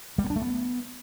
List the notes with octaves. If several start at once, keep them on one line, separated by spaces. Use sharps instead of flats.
G3
B3
D4
A3
B3